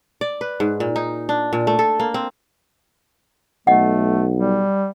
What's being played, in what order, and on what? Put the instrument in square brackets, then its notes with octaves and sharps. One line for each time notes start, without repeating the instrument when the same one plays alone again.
[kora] D5
B4
G#2
A#2
D#4
D4
A#2
A3
A4
A#3
C4
[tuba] B1 [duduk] A3 [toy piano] D#5 F#5
[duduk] G3